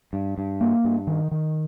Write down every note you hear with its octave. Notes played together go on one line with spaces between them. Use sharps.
G2
G2
A#3
G2
D#3
D#3